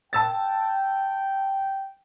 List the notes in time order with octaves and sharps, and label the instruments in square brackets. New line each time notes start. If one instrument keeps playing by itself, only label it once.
[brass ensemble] G5 [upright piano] A5 E6 A6